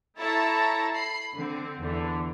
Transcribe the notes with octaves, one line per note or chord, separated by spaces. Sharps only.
E4 A4 C#5 E5 A5 A#5
B5 C7
D3 C4
E2 D3 E3